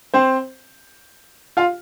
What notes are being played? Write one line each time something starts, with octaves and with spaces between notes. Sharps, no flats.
C4 C5
F4 F5